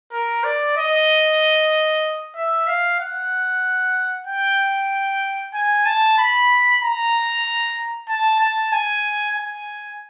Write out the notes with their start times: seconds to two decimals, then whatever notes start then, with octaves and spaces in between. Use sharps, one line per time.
0.12 A#4
0.44 D5
0.77 D#5
2.36 E5
2.67 F5
3.00 F#5
4.27 G5
5.54 G#5
5.86 A5
6.18 B5
6.82 A#5
8.09 A5
8.41 A5
8.72 G#5
9.37 G#5